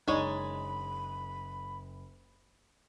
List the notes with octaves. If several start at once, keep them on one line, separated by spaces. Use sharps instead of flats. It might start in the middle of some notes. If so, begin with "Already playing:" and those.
F#1 G#3 D4 D#4 C#5 G#5 B5